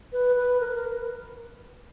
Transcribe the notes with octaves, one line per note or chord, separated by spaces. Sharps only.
B4
B4
A#4
B4
A#4